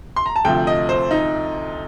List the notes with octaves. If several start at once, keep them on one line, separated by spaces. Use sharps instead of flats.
C6
A#5
A5
D2 C3 F3 G5
D#5
C5
D#4